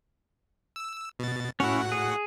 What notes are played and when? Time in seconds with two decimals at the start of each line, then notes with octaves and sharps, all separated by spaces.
0.76 E6
1.19 B2 A6
1.60 A2 C#4 E4 F#4 F#5
1.92 G#4